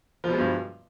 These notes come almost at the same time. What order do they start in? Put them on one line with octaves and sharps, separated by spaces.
F3 B2 G#3 G2